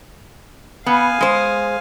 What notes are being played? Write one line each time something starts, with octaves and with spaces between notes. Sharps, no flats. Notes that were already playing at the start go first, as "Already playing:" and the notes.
B3 F5 G#5
G#3 C5